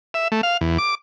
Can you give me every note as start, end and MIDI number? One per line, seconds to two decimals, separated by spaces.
0.14 0.28 76
0.32 0.41 57
0.43 0.57 77
0.61 0.78 40
0.78 0.95 86